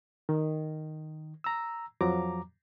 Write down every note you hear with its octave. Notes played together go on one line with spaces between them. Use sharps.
D#3
A#5 E6
F2 F3 F#3 A#5 D6